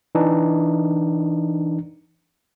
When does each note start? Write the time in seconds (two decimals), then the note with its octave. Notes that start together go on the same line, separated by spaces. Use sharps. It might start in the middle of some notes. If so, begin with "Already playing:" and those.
0.15 E3 D4 D#4